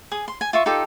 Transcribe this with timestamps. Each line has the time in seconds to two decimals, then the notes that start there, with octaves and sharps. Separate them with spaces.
0.11 G#4 D#6
0.28 C6
0.41 G#5
0.53 F4 E5 C#6
0.66 D#4 F4 G4 A4